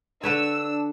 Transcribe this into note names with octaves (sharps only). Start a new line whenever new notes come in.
D3 D4 B4 C#5 E6